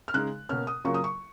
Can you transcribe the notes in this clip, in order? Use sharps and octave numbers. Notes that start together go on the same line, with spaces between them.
F6
C#3 G#3 D#4 F#6
B2 A#3 C#4 F6
D#6
C#3 F#3 A#3 F4 C#6
D#6
C#6